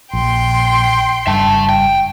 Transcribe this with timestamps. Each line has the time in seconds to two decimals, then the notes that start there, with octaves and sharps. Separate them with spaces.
0.13 A#1 G5 C6
1.27 F#1 G2 E5 A5
1.69 G5